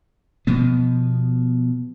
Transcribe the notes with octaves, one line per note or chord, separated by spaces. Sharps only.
B2 F3 B3